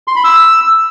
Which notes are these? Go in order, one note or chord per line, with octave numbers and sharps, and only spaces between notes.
C6
B5
E6